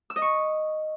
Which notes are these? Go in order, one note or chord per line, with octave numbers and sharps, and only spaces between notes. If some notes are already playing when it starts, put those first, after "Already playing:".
E6
D#5
C#6